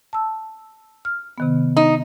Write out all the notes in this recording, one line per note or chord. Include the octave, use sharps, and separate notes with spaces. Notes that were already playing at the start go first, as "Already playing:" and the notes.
A5 E6
F6
C3 D#3 B3
D#4